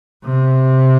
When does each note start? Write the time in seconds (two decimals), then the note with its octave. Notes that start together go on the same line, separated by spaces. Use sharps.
0.25 C3